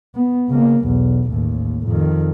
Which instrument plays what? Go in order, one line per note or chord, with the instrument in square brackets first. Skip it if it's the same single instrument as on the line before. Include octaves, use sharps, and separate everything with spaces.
[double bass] B3
C#3 A#3
B1 E2
A1 D#2
F2 D#3